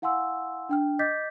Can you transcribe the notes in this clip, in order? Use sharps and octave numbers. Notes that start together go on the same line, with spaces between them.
E4 F5 F#5 G#5 C6 E6
D4 G5 F6
D#5 D6 G6 A6 B6